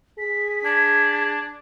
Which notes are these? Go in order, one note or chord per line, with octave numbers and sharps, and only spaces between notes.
G#4 B6
D4 G#6